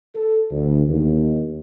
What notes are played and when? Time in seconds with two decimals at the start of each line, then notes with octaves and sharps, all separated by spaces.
0.15 A4
0.51 D2
0.88 D#2